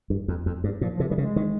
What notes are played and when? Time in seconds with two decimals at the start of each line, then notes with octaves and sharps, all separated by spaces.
0.10 G2
0.28 F2
0.46 F2
0.64 G2
0.81 A#2 F3
0.95 F3
1.00 C3
1.09 G3
1.11 D#3
1.18 C#3
1.22 G#3
1.36 D#3